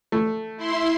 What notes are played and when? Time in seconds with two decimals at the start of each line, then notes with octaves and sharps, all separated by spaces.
0.12 A3
0.57 E4 C6